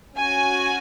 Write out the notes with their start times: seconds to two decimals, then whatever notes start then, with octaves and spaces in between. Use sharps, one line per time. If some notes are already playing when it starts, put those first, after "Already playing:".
0.15 C#4 F#4 G#5